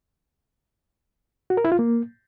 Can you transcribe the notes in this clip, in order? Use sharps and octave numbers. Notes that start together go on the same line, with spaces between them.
F#4
A#4
E4
F4
A#3